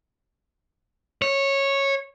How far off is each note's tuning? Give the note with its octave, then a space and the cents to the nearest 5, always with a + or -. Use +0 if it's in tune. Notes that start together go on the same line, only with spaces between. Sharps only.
C#5 -10